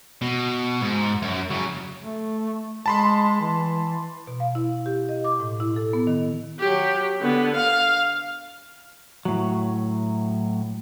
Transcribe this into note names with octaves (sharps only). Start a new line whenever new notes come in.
B2
G#2
F#2
C#3 F#3
A3
G#3 A5 B5 C6
E3
B2
F5
E4
G4
D#5
D6
A2
E4
A4
B3
D#3
F#3 G4
D3 B3
F5
A2 F#3